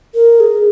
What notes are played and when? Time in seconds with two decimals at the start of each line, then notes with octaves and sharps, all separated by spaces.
0.15 A#4
0.40 G#4